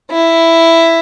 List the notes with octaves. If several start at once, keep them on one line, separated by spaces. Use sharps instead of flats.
E4